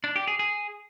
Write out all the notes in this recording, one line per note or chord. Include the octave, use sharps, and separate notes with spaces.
D4
G4
G#4
G#4